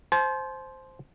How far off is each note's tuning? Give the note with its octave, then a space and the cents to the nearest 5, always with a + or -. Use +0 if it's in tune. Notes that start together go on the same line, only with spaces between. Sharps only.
C5 +0 A5 -45